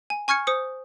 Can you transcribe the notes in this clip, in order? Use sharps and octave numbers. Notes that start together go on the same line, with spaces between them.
G#5
G#5 C#6 F6 G#6 C#7
C5 D#6 C#7